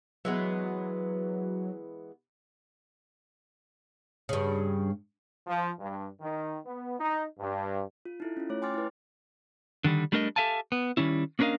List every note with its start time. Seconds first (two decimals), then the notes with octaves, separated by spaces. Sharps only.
0.25 E3 F#3 G#3 B3
4.29 G2 C#3
5.47 F3
5.80 G2
6.21 D#3
6.65 B3
7.00 D#4
7.39 G2
8.05 F4
8.20 D#4 E4 A4
8.37 C#4 F4
8.50 A3 C#5
8.62 G5 G#5 C6 D6 F6 A6
8.74 E4 B4
9.84 D3 D#3 G3
10.12 G3 A3 D4 A#4 D5 D#5
10.36 G4 A4 E5 F5 G#5 A5
10.72 B3
10.97 D#3 G3 C#4 E4
11.39 A#3 C#4 D4 A#4 D#5 F5